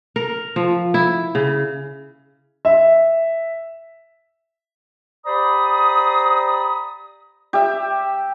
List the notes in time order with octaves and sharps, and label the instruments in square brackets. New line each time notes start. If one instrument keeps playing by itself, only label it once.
[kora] A#4
F3
E4
C#3
[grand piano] E5
[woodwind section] G4 C5 D5 A#5 B5 D#6
[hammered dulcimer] G4 E5